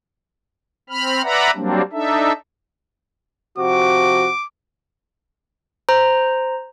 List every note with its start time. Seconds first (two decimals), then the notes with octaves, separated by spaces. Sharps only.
0.89 C4 B5 F6
1.23 B4 D5 E5 F#5 A#5 B5
1.55 F#3 G3 A#3 C4 D4
1.92 D4 D#4 A4 E5
3.59 C3 F3 F#4 D6
5.89 C5 A#5